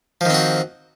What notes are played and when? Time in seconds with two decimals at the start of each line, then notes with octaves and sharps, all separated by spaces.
0.21 F3
0.25 D#3
0.30 C4
0.34 F#4